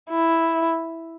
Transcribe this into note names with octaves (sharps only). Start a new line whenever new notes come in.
E4